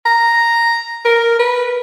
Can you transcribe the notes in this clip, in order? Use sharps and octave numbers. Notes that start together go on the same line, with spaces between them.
A#5
A#4
B4